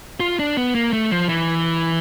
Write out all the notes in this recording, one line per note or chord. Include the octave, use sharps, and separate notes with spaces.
F4
D4
B3
A#3
A3
F3
E3